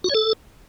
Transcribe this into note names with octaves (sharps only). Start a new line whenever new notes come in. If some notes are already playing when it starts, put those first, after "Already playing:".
F#4
C#5
A4